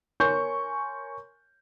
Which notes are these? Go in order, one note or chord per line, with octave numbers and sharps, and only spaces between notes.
A#4 C#5 G#5 C6 C#6 G6